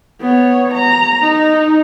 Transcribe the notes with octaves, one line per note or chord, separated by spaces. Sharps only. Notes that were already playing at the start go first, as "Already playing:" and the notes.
B3 C#5
A#5
D#4